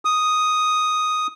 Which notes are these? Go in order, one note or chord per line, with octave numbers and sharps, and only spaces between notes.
D#6